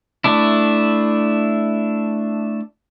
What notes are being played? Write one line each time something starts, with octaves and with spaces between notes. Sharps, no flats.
A3 D4 E4